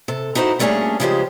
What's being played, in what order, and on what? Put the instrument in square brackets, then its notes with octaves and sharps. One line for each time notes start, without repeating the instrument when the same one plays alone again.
[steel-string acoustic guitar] C3 A4
D#4 E4 F#4 B4 C5
G3 A3 A#3 C#4 D4 G#4
C#3 F3 G#3 D4 G4 C5